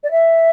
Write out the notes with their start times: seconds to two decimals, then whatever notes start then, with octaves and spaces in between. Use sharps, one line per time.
0.04 D5
0.11 E5